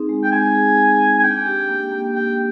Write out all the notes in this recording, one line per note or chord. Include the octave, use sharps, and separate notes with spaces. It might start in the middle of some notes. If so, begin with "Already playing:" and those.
Already playing: C4 D#4 G#4
G#3
G5
C4 G#5
G#4
G#4
G#4
G#5
D4 G5
G4
A#3
A#3
G4 G5